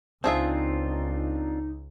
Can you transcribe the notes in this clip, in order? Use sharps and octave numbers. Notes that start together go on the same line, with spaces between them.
C#2 F3 C4 D4 D#4 F4 G#4 E5